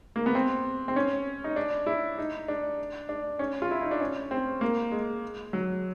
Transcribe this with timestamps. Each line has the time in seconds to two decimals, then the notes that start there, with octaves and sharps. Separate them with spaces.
0.16 A#3
0.26 B3
0.35 C4
0.88 C4
0.96 C#4
1.44 D#4
1.56 D4
1.87 E4
2.18 D#4
2.48 D4
3.09 D4
3.39 C#4
3.62 F4
3.71 E4
3.81 D#4
3.91 D4
4.01 C#4
4.31 C4
4.61 A#3
4.91 G#3
5.53 F#3